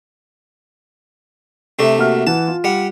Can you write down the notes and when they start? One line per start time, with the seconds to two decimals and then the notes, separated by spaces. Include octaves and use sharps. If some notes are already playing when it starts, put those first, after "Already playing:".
1.79 C3 A3 D4
1.98 A#3 F#4 F6
2.27 E3 F#5 A5
2.48 F4
2.64 G3 F#5